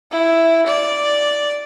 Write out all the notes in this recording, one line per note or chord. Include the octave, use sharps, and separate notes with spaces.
E4
D5